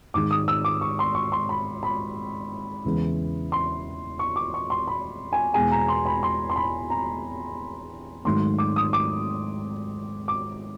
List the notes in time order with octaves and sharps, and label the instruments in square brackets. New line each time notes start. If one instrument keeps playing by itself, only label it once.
[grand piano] G#2 D#3 G#3 D6
D#6
E6
D6
C#6
C6
C#6
C6
B5
B5
E2 C#3 E3 G#3
C6
C#6
D6
C#6
C6
B5
G#5
E2 B2 G#3 B3 G#5
A#5
C6
B5
C6
C6
B5
A#5
G#2 D#3 F#3 A3 C6
D6
D#6
D6
D6